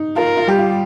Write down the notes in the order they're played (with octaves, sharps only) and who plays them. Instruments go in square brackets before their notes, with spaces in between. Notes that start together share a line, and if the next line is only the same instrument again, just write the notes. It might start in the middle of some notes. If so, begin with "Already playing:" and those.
Already playing: [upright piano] D#4
[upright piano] F4 [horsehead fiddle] A#4
[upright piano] F4
[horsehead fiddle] G3 [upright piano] G4
[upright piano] F4